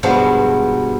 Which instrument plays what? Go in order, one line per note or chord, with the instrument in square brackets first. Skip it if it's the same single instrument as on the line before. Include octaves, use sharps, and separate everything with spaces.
[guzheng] G2 B2 F3 F#3 G#3